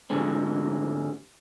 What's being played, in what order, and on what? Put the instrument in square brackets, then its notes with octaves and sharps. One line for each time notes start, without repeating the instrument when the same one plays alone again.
[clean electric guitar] D2 G#2 D3 G3 G#3 C4